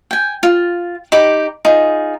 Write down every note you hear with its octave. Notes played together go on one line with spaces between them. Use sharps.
G5 G#5
F4
D#4 G4 B5 D6
D#4 F4 G#4